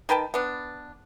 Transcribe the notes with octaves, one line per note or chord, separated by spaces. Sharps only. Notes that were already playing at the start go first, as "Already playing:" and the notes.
D#3 B4 G5 A5
B3 D4